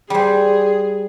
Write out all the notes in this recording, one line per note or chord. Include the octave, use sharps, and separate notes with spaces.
G3 G#4 C5